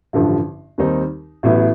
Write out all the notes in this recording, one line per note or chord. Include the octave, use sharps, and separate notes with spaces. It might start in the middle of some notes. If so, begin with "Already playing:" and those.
A1 G2 D3 F3
D#2 D#3 G3 C4 D#4
A1 A2 F#3 B3